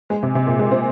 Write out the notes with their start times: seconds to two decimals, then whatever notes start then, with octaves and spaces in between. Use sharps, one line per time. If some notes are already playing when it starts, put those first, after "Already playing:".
0.10 G#3
0.23 C3
0.35 C3
0.47 A#2
0.59 G#3
0.71 C4